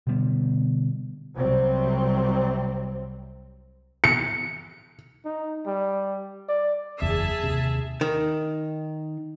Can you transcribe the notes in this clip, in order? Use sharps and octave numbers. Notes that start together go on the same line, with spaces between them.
B2 D3 G3 B3
C2 C3 F#3 G3 C4
C#7
D#4
G3
D5
F#1 E2 G#4 E5 A5
D#2 C3
D#3